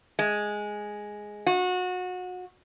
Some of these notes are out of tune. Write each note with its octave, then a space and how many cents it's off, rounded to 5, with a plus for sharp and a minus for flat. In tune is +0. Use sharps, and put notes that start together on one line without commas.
G#3 +0
F#4 -25